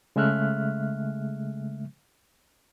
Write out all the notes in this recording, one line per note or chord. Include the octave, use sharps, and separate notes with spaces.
C#3 G#3 A3 E5 F6 F#6